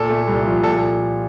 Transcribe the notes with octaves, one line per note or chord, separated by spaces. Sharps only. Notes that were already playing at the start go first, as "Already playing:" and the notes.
Already playing: A#2 A4
A3
C2
F3
A#2 A4